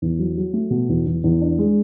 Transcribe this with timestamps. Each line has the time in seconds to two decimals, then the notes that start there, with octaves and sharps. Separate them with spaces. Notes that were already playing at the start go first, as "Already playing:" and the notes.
0.02 E2
0.19 F#3
0.37 F#3
0.53 A3
0.71 B2
0.89 E2
1.06 E2
1.24 E2
1.41 D4
1.59 G#3